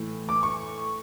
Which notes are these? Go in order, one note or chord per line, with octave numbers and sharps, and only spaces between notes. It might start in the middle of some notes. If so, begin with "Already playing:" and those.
Already playing: A2 E3
D6
C#6